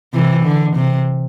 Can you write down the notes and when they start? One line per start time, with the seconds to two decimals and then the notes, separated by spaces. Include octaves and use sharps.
0.14 C3 E3
0.44 D3
0.76 C3